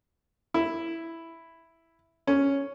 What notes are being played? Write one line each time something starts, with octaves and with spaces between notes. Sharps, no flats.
E4
C#4